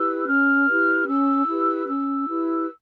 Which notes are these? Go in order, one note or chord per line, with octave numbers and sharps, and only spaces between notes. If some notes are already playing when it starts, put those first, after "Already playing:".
Already playing: E4 G4 B4 E6
C#4 F6
E4 G4 B4
C#4 E6
E4 G4 B4
C#4 E6
E4 G4 B4